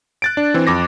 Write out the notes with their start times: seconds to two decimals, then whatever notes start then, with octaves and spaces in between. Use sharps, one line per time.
0.22 F#6 A6 D7
0.37 D4
0.54 E3 C4
0.67 F2 D6 A#6